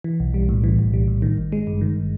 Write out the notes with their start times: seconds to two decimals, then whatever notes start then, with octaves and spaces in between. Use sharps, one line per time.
0.04 E3
0.20 B1
0.34 G3
0.49 A2
0.64 E3
0.79 B1
0.94 G3
1.08 A2
1.22 D#3
1.38 G#1
1.52 G#3
1.67 G2
1.81 D#3